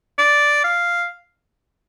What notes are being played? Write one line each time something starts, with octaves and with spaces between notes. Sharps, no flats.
D5
F5